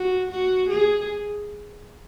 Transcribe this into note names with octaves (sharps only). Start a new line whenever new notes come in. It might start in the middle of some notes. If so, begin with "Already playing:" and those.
Already playing: F#4
F#4
G#4